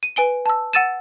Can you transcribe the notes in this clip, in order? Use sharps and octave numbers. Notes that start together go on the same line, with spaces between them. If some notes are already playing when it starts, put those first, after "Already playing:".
D#7
B4 G#5 D7 G7
A5 E6
F#5 E6 A6 D#7 E7